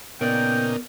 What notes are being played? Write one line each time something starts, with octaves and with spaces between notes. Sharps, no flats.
A#2 C#3 B3 D#4 A#4 D5 G5